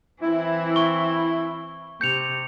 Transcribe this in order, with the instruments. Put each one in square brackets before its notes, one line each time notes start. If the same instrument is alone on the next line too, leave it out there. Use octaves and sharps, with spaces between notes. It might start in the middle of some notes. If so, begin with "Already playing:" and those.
[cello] E3 C4 [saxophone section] E4
[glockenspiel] C#6 G7
[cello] C3 [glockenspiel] G6 C#7 F7